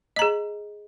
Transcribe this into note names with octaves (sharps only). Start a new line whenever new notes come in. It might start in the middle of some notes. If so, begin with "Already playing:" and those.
G#4 D#5 A#5